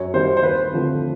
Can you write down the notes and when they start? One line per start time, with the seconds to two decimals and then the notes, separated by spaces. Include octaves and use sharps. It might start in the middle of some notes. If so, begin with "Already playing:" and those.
Already playing: F#2 C#5
0.14 D#3 G3 A#3 C5
0.37 C5
0.42 D#2 B4
0.71 D3 F3 A3 C4